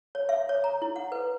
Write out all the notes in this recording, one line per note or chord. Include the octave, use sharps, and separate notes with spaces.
C#5
E5
C#5
A#5
E4
F#5
B4